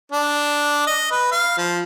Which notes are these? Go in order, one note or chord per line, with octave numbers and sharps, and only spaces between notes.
D4
D#5
B4
F5
F3